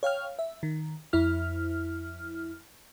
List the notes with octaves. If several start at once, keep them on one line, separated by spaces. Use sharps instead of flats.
C#5 F5 G5 F6
E5
D#3
F2 E4 F6